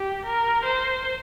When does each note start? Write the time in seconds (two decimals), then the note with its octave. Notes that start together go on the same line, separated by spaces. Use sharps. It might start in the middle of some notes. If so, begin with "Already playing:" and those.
Already playing: G4
0.25 A#4
0.64 C5